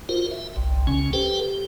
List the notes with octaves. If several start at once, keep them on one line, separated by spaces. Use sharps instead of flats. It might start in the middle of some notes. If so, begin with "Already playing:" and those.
F4 F#4 A#4 C5
E5
G1 C2
C#2 C#3 C#4
G4 A4 B4 C5 G5
G4